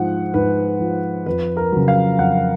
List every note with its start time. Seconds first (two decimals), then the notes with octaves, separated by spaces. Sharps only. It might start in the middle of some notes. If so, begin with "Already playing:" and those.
Already playing: G#2 F3 F#5
0.34 G#2 B4
0.80 F3
1.26 F2 B4
1.57 A#4
1.72 C#3 F#3
1.88 F5
2.19 F2 F#5